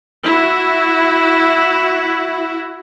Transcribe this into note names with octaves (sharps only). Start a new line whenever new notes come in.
E4 F#4